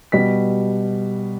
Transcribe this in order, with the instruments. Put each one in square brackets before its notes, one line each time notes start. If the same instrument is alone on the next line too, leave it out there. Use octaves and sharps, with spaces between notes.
[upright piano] B2 G3 B6